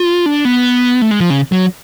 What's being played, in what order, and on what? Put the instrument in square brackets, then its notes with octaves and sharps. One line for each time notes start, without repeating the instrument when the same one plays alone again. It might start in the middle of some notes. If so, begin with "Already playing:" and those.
Already playing: [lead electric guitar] F4
D4
B3
A3
G#3
F3
C#3
F#3